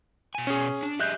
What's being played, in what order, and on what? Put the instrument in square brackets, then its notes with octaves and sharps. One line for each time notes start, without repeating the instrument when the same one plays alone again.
[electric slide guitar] B2 G#5
[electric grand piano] C#4 G#4
[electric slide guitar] D4
[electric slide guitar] G4 G#4 D#5 [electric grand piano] E5 F#6 G6